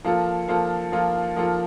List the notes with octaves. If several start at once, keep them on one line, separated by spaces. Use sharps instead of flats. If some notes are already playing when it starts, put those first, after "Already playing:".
F3 A#3 F4 A4
F3 A#3 F4 A4
F3 A#3 F4 A4
F3 A#3 F4 A4